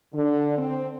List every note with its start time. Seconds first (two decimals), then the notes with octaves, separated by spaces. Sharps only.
0.14 D3
0.58 C4